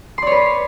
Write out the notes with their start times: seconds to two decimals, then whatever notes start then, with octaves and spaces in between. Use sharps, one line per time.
0.18 C6
0.22 D5
0.27 C#5
0.31 B4